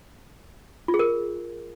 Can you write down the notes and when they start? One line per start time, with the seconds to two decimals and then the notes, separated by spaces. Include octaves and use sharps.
0.88 F4
0.94 G#4
0.99 A#4